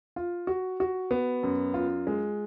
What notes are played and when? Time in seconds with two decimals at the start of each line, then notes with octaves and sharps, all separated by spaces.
0.16 F4
0.47 F#4
0.80 F#4
1.11 B3
1.43 F#2
1.74 F4
2.07 G#3